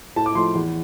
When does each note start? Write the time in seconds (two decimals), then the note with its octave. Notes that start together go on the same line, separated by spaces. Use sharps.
0.16 A2 A5
0.26 D6
0.35 F3 A3 C6
0.55 E2